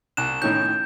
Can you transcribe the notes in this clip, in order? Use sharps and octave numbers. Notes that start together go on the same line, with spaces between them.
C2 F#6 E7
A2 D#3 C#4 G6